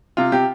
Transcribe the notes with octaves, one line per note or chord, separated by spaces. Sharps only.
C3 F4
C3 G4